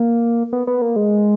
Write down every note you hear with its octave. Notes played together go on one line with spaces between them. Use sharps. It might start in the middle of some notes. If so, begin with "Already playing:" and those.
Already playing: A#3
B3
B3
A#3
G#3